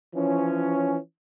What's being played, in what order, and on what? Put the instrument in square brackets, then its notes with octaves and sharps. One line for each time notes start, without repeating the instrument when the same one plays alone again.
[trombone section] E3 F3 C#4